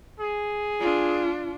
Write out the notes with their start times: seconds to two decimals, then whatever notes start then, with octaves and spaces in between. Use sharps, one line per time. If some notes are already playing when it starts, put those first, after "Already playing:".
0.20 G#4
0.80 D4 F4